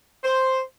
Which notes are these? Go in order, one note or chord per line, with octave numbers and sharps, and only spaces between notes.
C5